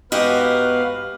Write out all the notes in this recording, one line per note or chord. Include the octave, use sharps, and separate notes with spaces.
G#2 B3 F#4 G4 B4 D#5 F5